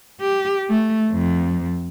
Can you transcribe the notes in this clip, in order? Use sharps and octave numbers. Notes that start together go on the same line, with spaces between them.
G4
A3
F2